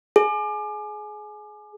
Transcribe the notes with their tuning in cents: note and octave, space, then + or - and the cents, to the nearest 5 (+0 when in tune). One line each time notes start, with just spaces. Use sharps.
G#4 +25